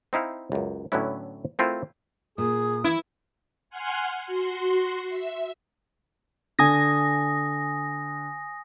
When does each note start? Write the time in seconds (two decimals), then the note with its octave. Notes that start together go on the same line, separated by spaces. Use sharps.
0.13 C4 D#4 E4 F5
0.52 C#2 F#2
0.92 A2 D3 F#3 B3 C#4 E4
1.59 A3 C4 E4 F4 A#4
2.38 A#2 G#4 D#6
2.84 E3 E4
3.70 F#5 G#5 C6 F6 F#6
4.27 F#4 C6
5.09 E5
6.59 D3 G#5 D#6 A#6